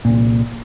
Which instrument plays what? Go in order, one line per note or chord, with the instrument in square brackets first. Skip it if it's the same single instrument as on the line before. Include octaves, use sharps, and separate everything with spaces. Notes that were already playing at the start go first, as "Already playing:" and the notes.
[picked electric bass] C2 A#2